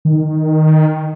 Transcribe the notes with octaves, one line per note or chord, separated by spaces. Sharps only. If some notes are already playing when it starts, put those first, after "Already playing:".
D#3